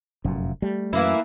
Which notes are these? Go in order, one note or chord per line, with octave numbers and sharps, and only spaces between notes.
F1 F#2 A#2
G3 A3
F#2 E3 A#3 E4